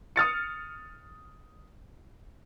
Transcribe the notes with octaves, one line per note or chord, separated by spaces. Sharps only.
D#6 F6 A6 C#7